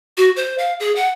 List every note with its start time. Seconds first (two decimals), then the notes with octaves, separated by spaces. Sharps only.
0.17 F#4
0.36 C5
0.58 F5
0.80 G#4
0.96 F#5